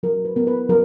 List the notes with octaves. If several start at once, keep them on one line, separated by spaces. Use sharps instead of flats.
F#3 A#4
B4
B3 A#4
B4
F#3 A#4